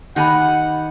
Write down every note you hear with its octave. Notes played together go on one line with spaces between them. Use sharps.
D#3 G4 F#5 G#5 B5